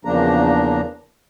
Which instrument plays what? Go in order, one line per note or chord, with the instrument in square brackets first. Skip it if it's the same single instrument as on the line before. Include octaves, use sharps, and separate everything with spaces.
[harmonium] E2 C#3 F3 A#3 D4 A#5